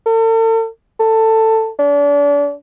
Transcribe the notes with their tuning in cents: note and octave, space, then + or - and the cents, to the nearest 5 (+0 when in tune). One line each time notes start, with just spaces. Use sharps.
A4 +45
A4 +15
D4 -35